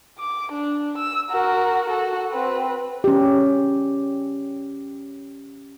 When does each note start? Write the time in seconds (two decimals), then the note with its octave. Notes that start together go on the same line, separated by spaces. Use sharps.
0.19 D6
0.52 D4
0.97 E6
1.31 F#4 A#4
1.89 F#4 A4
2.32 C4 B4
3.04 C#4 G4